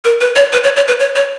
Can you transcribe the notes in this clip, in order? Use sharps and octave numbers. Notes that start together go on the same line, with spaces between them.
A#4
B4
C#5
B4
C#5
C#5
B4
C#5
C#5